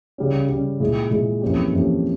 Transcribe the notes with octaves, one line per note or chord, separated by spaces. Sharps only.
C#3 G3 C#4
C#3 G3 C#4
A#2 G#3 E4 G#4
A#2 G#3 E4 G#4
F2 E3 A#3 C#4 G4
F2 E3 A#3 C#4 G4